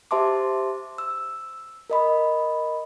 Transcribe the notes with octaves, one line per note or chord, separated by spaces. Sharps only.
G4 C5 E5 A5 C6 D6
E6
A#4 D#5 B5